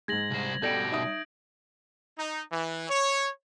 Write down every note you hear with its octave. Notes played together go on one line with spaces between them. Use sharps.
G#2 G#3 G#6 A#6 F#7
C2 C5
B2 G3 A4 D5 G5 G6 A#6 D7
D#4 E5 D#6
D#4
E3
C#5